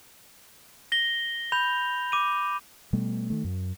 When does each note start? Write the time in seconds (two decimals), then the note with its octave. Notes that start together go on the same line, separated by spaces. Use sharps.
0.92 A#6 G7
1.52 B5 G6 F7
2.12 D6 D#7
2.93 B2 G3 A3 B3
3.30 D#3 A3
3.44 F#2